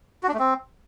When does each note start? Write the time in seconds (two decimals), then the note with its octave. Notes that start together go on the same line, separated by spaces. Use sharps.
0.23 F#4
0.28 D4
0.34 A3
0.39 C4